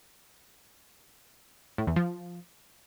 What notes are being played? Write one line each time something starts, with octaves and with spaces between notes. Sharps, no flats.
A2
E2
F3